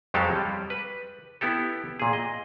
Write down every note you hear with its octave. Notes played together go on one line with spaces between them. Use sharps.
F2 F#3 G#3 G4 A4 F5
G3
B4
B3 E4 G4 A4
A#2 G#4
D#5